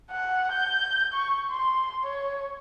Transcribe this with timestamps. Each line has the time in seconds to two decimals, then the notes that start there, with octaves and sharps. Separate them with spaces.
0.11 F#5
0.52 G6
1.13 C#6
1.50 C6
2.03 C#5